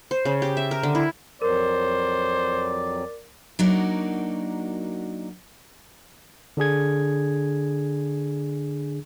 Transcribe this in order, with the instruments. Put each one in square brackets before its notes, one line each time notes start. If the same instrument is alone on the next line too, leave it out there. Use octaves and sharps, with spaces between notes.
[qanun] C5
C#3
G4
E5
A#4
D3
E4
[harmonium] F2 F#3 [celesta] A#4 [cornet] C5 [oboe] D5
[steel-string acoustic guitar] F#3 A#3 D4 D#4 F#4 A#4
[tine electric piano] D3 D4 G#4 G#6